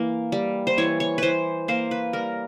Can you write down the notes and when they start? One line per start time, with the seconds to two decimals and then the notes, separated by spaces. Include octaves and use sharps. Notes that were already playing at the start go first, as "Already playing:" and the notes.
Already playing: E3 A#3
0.32 G3
0.67 C5
0.78 E3 C#5
1.00 C#5
1.18 E3 B4 C5
1.68 A#3 C5
1.91 B4
2.13 G3 A#4